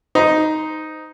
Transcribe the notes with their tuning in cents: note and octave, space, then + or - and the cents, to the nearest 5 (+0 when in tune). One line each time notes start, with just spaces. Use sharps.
D#4 +0 C5 -25